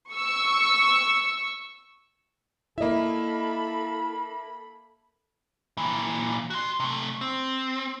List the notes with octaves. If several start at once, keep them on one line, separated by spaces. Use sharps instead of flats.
C#6 E6
A#3 E4 A4 D#5 E5 B5
A#2 E3
F#4 C6
C3 A3
C4